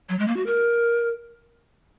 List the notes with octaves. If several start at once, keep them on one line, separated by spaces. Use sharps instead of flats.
F#3
G#3
A#3
F#4
A#4